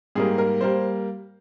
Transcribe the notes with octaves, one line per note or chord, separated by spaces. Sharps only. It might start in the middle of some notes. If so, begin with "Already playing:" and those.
G#2 G3 A#3 G#4
A#4
G3 A#3 C5